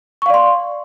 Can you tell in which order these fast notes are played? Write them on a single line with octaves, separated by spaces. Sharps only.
C#6 F5 D5 C6